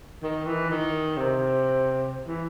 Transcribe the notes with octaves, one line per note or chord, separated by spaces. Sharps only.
D#3
E3
D#3
C3
E3